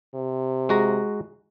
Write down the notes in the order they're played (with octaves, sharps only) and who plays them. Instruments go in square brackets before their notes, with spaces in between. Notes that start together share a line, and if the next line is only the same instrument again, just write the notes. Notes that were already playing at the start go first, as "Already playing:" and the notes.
[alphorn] C3
[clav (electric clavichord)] G#3 F#4 A#5